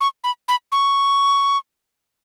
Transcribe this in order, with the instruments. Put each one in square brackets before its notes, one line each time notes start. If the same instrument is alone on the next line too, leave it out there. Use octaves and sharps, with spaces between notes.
[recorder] C#6
B5
B5
C#6